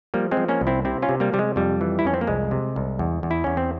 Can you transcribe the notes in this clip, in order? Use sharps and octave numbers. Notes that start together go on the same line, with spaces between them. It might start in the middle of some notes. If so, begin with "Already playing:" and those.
F3 G3 A#3
G#3 C4
F3
A#3 C#4
C2
C4 E4
C3 C4 E4
C#4 F4
C3
G3 A#3
C3 G3
G#3
F2 G3
E3
E4
F2 C#4
C4
A#3
C2 G#3
C3
C2
E2
E2
E4
E2 C#4
C4